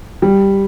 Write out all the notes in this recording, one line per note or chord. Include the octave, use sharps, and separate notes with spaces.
G3